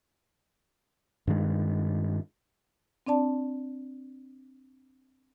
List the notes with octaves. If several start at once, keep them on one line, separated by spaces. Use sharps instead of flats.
G2 D#3 G#3
C4 D4 D5 A5